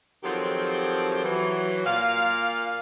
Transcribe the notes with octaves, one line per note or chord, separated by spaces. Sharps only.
D#3 F3 F#3 C4 G4 A4
E3 F#3
A#2 F5